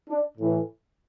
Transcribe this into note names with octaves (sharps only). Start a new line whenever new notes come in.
D4
A2 E3